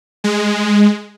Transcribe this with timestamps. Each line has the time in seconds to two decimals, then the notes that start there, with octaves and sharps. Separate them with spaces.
0.24 G#3